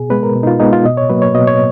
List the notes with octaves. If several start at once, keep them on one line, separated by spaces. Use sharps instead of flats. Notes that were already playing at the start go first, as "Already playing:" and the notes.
Already playing: B2 G#4
G#3 B3 B4
A#4
B2
D#4
F4
G#3 B3 D#4
F4
B2 D#5
C#5
F#3 A#3 B4
C#5
B2 D#5
C#5